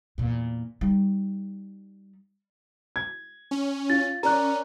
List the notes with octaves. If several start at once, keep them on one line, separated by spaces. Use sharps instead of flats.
E2 A#2
G3 D#4
G#6
C#4
F4 A6
C#4 A#4 D5 A#5 F#6